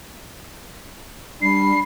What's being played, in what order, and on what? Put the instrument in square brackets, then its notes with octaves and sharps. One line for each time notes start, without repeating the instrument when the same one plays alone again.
[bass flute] G3 [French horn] D4 [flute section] B5 [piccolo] C7